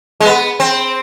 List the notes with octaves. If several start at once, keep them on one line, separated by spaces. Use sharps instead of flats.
G#3
B3
C4